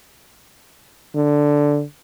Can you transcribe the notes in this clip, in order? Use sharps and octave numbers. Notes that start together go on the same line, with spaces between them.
D3